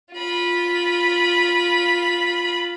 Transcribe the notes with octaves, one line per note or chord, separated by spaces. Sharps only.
F4 B5